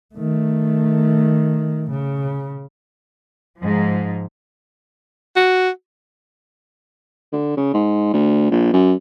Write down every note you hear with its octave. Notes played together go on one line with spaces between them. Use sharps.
D#3 A3
C#3
G#2 F3
F#4
D3
C#3
G#2
D2
A#1
F#2